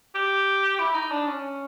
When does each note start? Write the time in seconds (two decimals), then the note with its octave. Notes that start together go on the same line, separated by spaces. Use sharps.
0.15 G4
0.79 E4
0.94 D#4
1.11 D4
1.27 C#4